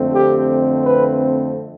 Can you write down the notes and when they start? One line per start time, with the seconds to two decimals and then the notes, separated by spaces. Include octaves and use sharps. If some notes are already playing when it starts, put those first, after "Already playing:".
Already playing: F2 D3 A3 C4
0.14 G4
0.83 B4